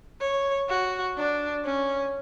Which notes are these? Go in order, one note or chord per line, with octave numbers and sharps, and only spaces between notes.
C#5
F#4
D4
C#4